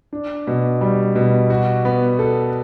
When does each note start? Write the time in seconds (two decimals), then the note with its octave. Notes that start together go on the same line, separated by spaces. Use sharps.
0.13 D4
0.47 B2
0.81 G3
1.15 B2
1.50 F#4
1.85 B3
2.19 A4